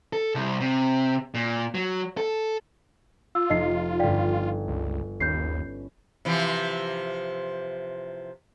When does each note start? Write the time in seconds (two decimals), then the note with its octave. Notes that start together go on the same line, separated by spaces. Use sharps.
0.13 A4
0.35 C2
0.60 C3
1.34 A#2
1.75 F#3
2.17 A4
3.35 F4 E6
3.50 F1 D#4 D#5 A5 C7
3.99 G1 D5 F5 G5 B6
4.68 C#2
5.20 D#2 C#4 B4 G6 C7
6.25 C3 E3 F3